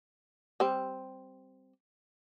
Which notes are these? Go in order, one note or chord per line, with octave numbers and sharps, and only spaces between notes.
G3 C4